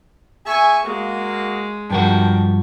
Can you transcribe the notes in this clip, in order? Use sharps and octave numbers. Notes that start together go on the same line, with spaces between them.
G#4 E5 G#5 C#6
G#3 A#3 F#4
G2 F3 D4 F#4 A#4 G5